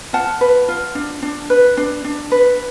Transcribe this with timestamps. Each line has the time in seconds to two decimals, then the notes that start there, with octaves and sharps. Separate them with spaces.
0.13 F4 F#5 A5
0.41 B4
0.68 F4
0.95 D4
1.22 D4
1.50 B4
1.77 D4
2.05 D4
2.32 B4